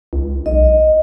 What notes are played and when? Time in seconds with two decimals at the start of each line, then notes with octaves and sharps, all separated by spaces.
0.13 C#2
0.46 B1 D#5